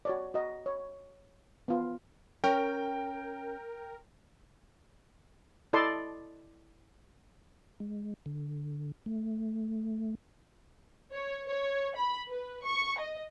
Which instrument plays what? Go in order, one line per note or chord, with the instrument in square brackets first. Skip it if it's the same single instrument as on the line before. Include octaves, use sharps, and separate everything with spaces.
[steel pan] F#4 C#5 D5
F#4 D#5
C#5
B3 F4
[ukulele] C#4 [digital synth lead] A#4 [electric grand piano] G5
[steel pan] E4 A4 D5 D#5 A5 C6
[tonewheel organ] G#3
D3
A3
[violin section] C#5
C#5
B5
B4
C#6
D#5